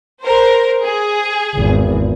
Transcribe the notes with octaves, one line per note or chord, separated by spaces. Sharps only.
A#4 C5
G#4
G#1 E2